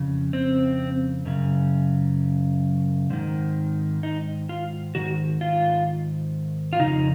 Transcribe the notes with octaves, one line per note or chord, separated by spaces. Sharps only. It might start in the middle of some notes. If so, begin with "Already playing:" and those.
Already playing: F2 C#3
C4
F#2 C#3
G#2 D#3
D#4
F4
G#2 D#3 F#4
F4
F4
F2 C#3 D#4